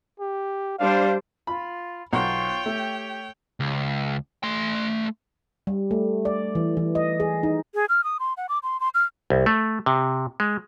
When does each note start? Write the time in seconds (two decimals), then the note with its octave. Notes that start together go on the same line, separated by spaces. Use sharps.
0.20 G4
0.79 G3 D4 C5 F5
1.47 F4 B5
2.13 B1 F4 C5 C#5 G5 C#6
2.66 A3 G4
3.60 C#2
4.43 A3 C6
5.67 G3
5.91 A3
6.25 D5
6.55 E3
6.77 E3
6.95 D#5
7.20 G#4
7.43 D#4
7.74 G#4
7.89 F6
8.04 D#6
8.20 C6
8.37 F#5
8.49 D6
8.63 C6
8.80 C6
8.94 F6
9.30 C2
9.46 A3
9.86 C3
10.40 G#3